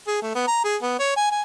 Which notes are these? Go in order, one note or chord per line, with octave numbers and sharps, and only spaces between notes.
G#4
A3
B3
A#5
G#4
B3
C#5
G#5
G#5